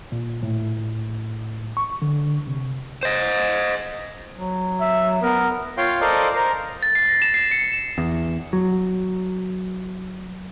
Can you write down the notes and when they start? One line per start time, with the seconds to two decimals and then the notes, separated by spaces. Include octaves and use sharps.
0.12 A#2
0.43 A2
1.77 C#6
2.02 D3
2.47 C3
3.03 C5 D#5
4.35 F#3
4.80 E5
5.22 B3 A#4
5.77 F4 C#5 F5 G5 C6
6.01 A4 A#4 C5 D5 D#5 F5
6.36 A#4 C5 A#5
6.83 A6
6.95 C7
7.09 A#6
7.22 E7
7.34 C7
7.52 C#7
7.98 E2
8.53 F#3